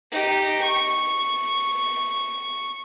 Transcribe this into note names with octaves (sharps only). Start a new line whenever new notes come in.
D#4 G4
C#6